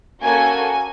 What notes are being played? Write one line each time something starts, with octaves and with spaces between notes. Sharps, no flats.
A#3 C#4 F#4 A4 G#5